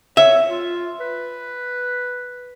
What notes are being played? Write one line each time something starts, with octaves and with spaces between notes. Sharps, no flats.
C#5 E5
F4
B4